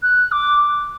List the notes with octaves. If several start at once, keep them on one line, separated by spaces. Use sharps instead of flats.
F#6
D6